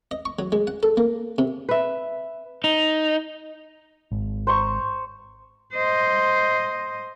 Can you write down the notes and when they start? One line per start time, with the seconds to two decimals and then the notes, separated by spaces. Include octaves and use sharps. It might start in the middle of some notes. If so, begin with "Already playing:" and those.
0.11 D#5
0.26 C#6
0.39 F#3
0.52 G#3
0.67 F#5
0.83 A4
0.97 A#3
1.38 C3
1.69 B4 E5
2.64 D#4
4.11 G#1
4.47 C5 A#5 C#6
5.74 C5 D#5